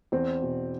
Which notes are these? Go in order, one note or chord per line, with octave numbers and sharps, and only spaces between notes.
E2 C4
B2